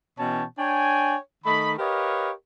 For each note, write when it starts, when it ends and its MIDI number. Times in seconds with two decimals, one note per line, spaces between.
0.19 0.43 47
0.19 0.43 52
0.19 0.43 61
0.19 0.43 73
0.19 0.43 79
0.19 0.43 81
0.58 1.17 62
0.58 1.17 73
0.58 1.17 79
0.58 1.17 80
1.45 1.72 51
1.45 1.72 57
1.45 1.72 75
1.45 1.72 83
1.79 2.32 67
1.79 2.32 70
1.79 2.32 71
1.79 2.32 73
1.79 2.32 75
1.79 2.32 77